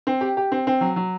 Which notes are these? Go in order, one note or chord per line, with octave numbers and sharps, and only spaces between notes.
C4
G4
G4
C4
C4
F#3
F#3